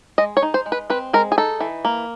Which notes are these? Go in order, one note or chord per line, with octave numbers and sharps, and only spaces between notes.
G#3 D#5
C#5
D#4
C5
G#3
B4
C4 B4
G#3 A#4
G#4
D#4 A4
E3
A#3